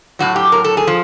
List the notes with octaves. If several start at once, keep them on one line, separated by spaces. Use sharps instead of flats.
A2 F#3 F#4
G4
A#4
A4
G#4
F3